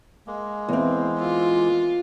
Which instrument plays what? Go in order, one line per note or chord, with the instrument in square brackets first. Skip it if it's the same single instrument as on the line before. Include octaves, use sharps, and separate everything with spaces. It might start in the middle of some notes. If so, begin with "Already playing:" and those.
[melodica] G#3 A#3
[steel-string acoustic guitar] E2 C4
[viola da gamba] F4